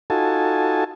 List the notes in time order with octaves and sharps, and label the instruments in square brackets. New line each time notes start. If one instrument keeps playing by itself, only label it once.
[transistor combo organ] D#4 F4 F#4 A4 G#5 A5